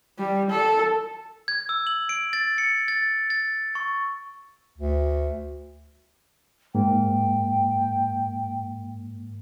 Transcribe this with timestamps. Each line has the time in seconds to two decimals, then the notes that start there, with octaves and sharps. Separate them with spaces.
0.19 G3
0.50 A4
1.48 G#6
1.69 E6
1.87 F#7
2.09 D7
2.33 A6
2.58 C#7
2.88 A6
3.30 A6
3.75 C#6
4.78 D2
6.75 G#2 A#3 G5